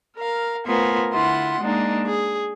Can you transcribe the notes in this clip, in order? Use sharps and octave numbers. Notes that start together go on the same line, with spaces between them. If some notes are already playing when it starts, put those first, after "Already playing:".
A#4 F5
A3 B3 F4 A#4 C5 G#5
D3 E4 F4 F#5 C6
G#3 A#3 D4 D#4
G#4